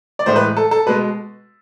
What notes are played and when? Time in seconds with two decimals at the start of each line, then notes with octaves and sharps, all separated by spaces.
0.19 D5
0.26 A2 E3 G#3 C5
0.36 B4
0.57 A4
0.71 A4
0.86 B2 G#3 B4